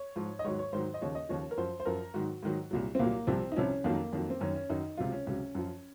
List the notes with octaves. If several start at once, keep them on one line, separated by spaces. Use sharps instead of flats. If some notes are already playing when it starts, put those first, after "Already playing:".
Already playing: C#5
G#2 F3
D#5
G#2 D#3 F#3 C#5
C#5
G#2 D#3 F#3 C5
D#5
D#2 C#3 F3 C#5
D#5
D#2 C#3 F3 C#5
A#4
F#2 F3 C5
C5
F#2 F3 A#4
G#2 D#3 F#3 F#4
G#2 D#3 F#3
C2 A#2 F#3
C4
C2 A#2 F#3 A#3
C2 C3 F3 C4
D#4
C2 C3 F3 C#4
F2 D#3 F#3 A#3
F2 D#3 F#3
C4
F#2 D#3 F#3 C#4
C#4
F#2 D#3 F#3 D#4
C#2 C3 F#3 F4
C#4
C#2 C3 F#3 C#4
F#2 F3